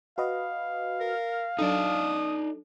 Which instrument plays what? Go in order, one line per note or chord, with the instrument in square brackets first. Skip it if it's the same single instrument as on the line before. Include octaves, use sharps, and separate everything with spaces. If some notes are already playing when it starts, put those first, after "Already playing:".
[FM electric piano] F#4 B4 D#5 [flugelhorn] F5
[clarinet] A#4
[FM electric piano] F#3 D4 A4 [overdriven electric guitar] D#4 D5 [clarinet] D#6